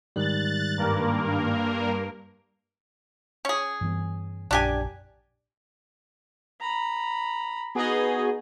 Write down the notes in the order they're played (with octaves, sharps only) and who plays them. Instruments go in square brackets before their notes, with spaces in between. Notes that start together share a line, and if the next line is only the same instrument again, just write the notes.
[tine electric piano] G#2 D#3 G3 [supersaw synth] F#6 A6
[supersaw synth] G2 A#3 A#4
[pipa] C#4 G#4
[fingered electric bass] G2 E3 B3
[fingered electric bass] A#1 F#2 [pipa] D4 G4 G#5
[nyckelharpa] A#5 B5
[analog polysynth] B3 F#4 G#4 [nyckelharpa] D#4 D#5